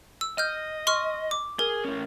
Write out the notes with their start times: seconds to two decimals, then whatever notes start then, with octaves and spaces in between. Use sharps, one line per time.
0.21 E6
0.38 D#5 F6 G6
0.87 C6 C#6 F6
1.31 D6
1.59 G#4 A#4
1.85 A2 C#4